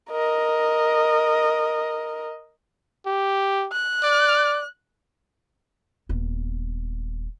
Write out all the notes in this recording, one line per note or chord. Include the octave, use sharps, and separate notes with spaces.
A#4 D#5
G4
F#6
D5
D#1 B3